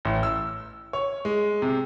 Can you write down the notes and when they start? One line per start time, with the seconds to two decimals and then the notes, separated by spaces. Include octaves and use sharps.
0.05 A1
0.23 E6
0.93 C#5
1.25 G#3
1.62 C3